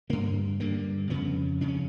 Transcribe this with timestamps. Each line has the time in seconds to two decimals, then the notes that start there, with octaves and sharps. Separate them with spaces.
0.10 G2 D3 A#3
0.60 G2 D3 A#3
1.10 F2 C#3 B3
1.61 F2 C#3 D4
1.68 C#4